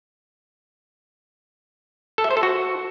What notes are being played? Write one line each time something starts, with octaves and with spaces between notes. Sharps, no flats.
A4
E5
C5
A4
F#4